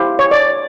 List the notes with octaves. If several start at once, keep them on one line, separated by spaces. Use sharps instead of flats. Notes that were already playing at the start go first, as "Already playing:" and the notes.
Already playing: E4 G4 C5 F5
C#5
D5